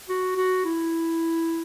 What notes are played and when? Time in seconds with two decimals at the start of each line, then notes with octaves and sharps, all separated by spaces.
0.09 F#4
0.36 F#4
0.65 E4